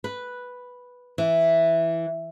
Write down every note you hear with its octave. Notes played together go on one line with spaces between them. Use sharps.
B4
E3